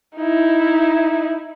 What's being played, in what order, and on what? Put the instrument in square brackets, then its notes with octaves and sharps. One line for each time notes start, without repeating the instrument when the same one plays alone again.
[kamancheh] D#4 E4